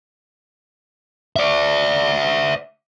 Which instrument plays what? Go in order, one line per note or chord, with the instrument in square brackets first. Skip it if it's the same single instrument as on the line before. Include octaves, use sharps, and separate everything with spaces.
[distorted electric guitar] D5 E5